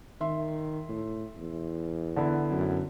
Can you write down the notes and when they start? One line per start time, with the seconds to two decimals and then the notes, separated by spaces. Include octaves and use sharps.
0.21 D#3 E5 C6
0.89 A2
1.37 E2
2.16 D3 B3 E4
2.51 F#2